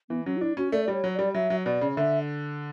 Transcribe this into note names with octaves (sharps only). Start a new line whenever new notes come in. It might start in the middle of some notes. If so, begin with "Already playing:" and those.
E3 B3
F#3 C#4
F#4
D4 E4
C#4 F#4
A3 D5
G3 D5
C#5
F#3
G3 D5
F#3 E5
F#3
B2 D5
C#3
D3 E5